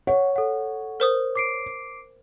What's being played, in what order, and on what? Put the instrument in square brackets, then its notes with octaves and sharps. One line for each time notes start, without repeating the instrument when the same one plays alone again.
[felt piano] C#5 [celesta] F#5
[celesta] A4 F#5
[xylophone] A#4 C5 D#6
[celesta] D6 C7 D7